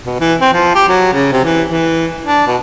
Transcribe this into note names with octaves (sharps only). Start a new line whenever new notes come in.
B2
E3
C4
F3
G4
F#3
C#3
C3
E3
E3
D4
B2